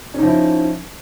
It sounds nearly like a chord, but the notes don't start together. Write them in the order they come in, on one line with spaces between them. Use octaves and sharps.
C#4 D#4 F3 E4